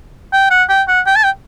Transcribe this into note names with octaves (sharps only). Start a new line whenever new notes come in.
G5
F#5
G5
F#5
G5
A5
G5